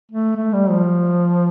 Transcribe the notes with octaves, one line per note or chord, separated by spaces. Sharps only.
A3
A3
G3
F3